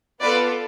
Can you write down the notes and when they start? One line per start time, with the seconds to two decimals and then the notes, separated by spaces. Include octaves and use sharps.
0.21 B3 F4 A4 B4 D5